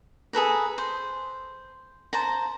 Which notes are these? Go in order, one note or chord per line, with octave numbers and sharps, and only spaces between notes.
G#4 A4 B4 A#5
C5
C5 A5 A#5